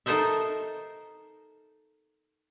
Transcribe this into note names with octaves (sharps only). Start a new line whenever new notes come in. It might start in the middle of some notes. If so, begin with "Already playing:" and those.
D#4 A4 A#4 C5 D#5 E5